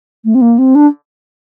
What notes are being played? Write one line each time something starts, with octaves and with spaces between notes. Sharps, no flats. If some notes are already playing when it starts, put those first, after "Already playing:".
A3
C4
A#3
C4
D4